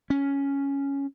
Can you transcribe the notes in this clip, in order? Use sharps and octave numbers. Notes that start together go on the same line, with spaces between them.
C#4